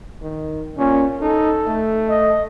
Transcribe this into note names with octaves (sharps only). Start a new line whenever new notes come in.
D#3
A#2 C#4
D#4 A4
A3
D#5